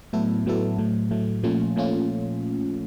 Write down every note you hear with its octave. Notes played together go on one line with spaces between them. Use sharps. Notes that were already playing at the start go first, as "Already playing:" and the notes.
A2 F#3 B3 E4 A4
A2 F#3 B3 E4 A4
A2 F#3 A3
A2 F#3 A3
A#2 F3 A3 C#4 F4
A#2 F3 A3 C#4 F4